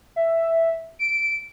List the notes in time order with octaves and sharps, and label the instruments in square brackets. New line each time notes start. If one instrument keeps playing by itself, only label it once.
[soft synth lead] E5
D7